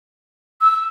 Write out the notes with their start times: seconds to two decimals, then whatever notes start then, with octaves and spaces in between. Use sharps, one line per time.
0.61 E6